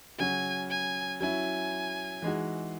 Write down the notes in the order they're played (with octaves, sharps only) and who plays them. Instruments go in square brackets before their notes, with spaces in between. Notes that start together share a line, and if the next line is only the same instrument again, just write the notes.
[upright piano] C#3 F#3 C#4 F#4 [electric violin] G#5
[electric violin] G#5
[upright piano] F#3 C#4 E4 [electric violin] G#5
[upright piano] E3 G#3 D#4 F#4